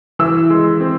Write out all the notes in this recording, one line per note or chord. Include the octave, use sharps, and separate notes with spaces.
E3 E6
G#3
C4